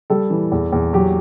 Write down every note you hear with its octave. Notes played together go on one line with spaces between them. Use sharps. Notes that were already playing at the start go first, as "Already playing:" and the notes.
G3 A4
E3
E2
E2
F#3 G4